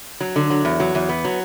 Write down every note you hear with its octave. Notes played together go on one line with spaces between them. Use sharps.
F#3
D3
F#3
E2
F#3
E2
B3
F#3